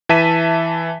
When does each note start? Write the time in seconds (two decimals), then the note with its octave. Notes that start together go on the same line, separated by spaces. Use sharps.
0.09 E3 E5 A5 B6 D#7